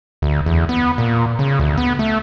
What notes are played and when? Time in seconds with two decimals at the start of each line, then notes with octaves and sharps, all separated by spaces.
0.22 D2
0.46 E2
0.69 B3
0.98 A#2
1.39 C#3
1.59 D2
1.78 B3
1.99 A3